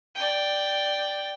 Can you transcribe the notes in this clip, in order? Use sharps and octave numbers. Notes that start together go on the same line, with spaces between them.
D5 G5